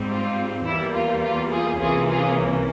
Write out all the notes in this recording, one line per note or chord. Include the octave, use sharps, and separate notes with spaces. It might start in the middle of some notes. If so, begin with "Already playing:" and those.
Already playing: G#2 G3 C4
F4
E2 E3 G3 A#3 E4
F4
F4
F4 G#4
C2 C3 E3 A#3 C#4 F4 G#4
F4 G#4